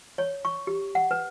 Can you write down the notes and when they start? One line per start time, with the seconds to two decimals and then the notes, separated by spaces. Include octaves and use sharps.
0.18 C#5
0.45 C#6
0.67 G4
0.95 F#5
1.11 B4